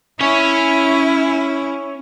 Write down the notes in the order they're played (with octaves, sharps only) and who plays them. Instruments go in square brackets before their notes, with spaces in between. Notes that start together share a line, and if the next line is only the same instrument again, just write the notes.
[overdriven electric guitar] C#4 C#5 [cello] E4